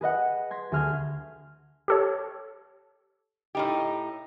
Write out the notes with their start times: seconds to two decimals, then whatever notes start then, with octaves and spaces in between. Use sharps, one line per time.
0.01 G#4 B4 D#5 F#5
0.50 C6 G#6 A#6 B6
0.72 D2 G#4 F6 G6 G#6
1.88 G4 A4 C#5
3.55 A2 D#4 G4